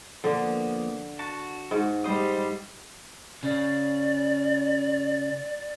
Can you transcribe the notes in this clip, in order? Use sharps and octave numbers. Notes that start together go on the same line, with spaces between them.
D3 F3 A#3 B3
F#4 A5
G#2
G3 C5 D#5
C#3 D5